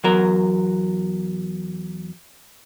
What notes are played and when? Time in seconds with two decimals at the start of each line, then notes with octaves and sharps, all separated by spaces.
0.04 E2 F#3 A#4